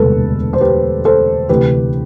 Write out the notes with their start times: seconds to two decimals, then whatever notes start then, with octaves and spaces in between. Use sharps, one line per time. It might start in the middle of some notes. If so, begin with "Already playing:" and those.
Already playing: E1 D2 C3 G3 A4 B4
0.53 C5
0.61 G4 B4
1.05 A4 C5
1.49 D2 C3 E3 G4 B4